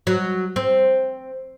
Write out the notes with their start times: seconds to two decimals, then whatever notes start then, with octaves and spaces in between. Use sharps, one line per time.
0.07 F#3
0.56 C4